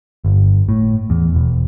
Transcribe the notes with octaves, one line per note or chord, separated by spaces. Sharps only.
G1
A2
E2
E1